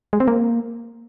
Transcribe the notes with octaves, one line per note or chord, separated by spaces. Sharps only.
G#3
C4
A#3